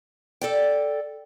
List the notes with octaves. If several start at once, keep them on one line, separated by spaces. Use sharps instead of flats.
A4 D5 G5